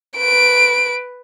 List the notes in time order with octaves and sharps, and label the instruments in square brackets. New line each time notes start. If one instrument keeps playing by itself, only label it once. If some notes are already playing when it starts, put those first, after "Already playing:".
[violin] B4 D7